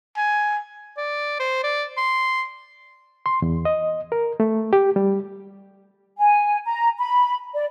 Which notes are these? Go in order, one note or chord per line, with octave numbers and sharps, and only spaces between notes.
G#5
D5
C5
D5
C6
C6
E2
D#5
A#4
A3
G4
G3
G#5
A#5
B5
D5